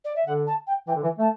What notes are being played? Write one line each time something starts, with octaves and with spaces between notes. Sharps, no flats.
D5
E5
D3 F#5
A5
G5
E3 G5
D3
E3
A3 A5